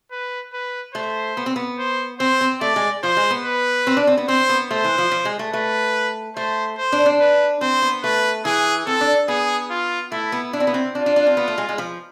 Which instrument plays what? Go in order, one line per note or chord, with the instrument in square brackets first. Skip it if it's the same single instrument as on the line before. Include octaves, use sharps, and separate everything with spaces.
[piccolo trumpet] B4
B4
[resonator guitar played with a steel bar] A3 [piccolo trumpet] C5
[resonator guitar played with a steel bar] B3
C4
B3
[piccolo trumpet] C5
[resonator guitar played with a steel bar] C4 [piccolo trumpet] C5
[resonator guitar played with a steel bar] C4
[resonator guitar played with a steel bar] A3 [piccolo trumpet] D5
[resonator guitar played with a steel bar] G#3
[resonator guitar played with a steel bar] F3 [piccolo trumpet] C5
[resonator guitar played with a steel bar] G#3
B3
[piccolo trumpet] B4
[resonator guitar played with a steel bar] C4
D4
C4
B3
[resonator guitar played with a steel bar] C4 [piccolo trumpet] C5
[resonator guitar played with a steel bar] B3
[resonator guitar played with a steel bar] A3 [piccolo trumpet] C5
[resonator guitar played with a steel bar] E3
F3
F3
G#3
A3
[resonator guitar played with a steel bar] A3 [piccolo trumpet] B4
[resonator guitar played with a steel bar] A3 [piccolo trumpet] C5
[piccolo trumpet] C5
[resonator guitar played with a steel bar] D4
D4
[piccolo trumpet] B4
[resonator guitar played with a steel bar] C4 [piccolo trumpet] C5
[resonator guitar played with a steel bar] B3
[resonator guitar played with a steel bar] A3 [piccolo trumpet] B4
[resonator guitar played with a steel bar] E3 [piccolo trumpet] G#4
[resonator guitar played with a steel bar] C4 [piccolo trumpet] A4
[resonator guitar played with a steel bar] D4
[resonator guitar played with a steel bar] B3 [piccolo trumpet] G#4
[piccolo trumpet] F4
[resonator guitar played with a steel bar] A3 [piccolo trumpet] E4
[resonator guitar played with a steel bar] B3
[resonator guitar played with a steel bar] D4 [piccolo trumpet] E4
[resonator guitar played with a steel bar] C4
B3
C4
[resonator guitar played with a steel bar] D4 [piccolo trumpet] F4
[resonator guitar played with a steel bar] D4
D4
C4
B3
A3
G#3
G#3
F3